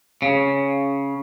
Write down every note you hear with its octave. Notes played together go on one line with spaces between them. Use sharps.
C#3